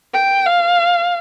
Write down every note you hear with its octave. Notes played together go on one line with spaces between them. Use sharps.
G5
F5